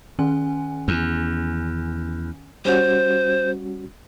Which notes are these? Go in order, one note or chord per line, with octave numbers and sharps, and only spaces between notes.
D#3 C#4 G#5
E2
G3 C#4 F#4 C5